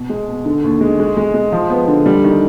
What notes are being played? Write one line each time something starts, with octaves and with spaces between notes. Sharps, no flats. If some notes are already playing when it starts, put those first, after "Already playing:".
Already playing: B2
G#3
B2
D3
D#2
G#3
G#3
G#3
G#3
F3
B3
D3
G3
D#3